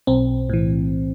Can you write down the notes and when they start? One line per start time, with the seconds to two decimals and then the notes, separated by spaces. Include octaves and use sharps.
0.07 B1 C4
0.49 A2 E3